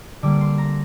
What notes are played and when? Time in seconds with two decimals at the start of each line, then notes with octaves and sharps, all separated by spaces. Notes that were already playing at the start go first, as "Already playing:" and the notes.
0.22 D3 G3 A#3 D6
0.41 C6
0.58 A#5